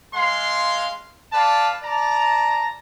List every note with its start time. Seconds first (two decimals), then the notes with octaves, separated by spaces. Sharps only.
0.15 G#3 F5 C6
1.33 B4 D5 F5 A5
1.83 D5 A5 A#5